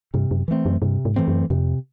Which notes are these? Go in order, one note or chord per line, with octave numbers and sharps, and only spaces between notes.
G2 C3
F#2
E3 A3 C4
F#2
G2 C3
G#2
E3 A3 C4
F#2
F2 C3